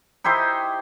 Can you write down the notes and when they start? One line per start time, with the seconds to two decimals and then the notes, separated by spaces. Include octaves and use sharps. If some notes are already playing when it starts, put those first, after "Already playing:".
0.24 D#4 E4 G4 C5